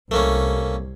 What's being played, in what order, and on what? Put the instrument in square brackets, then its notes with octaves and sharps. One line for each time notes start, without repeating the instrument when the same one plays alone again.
[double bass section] C2 [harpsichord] A3 A#3 C#4